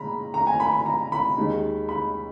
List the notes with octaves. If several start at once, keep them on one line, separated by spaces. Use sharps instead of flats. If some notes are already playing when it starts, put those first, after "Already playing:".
Already playing: A#2 G#3 A#5 B5
A#5
G#5
B5
B5
A#5
B5
D#2 D#3 G#3
B5